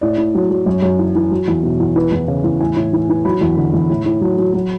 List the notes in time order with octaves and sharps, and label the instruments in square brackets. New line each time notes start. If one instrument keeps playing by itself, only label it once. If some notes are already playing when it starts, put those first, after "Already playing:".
[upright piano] A2 D5
A2
F#3
F#3
F#2 C#5
F#2
E3
E3
F#3
E2
B2
E2
E3 B4
E2
C#3
E2
A2 G#5
A2
E3
E3
F#3 B5
E2
D3
E2
A2
A2
F#3
F#3
F#3